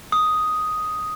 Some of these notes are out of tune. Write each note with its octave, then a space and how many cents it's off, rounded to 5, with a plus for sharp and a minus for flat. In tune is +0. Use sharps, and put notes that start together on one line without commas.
D#6 +5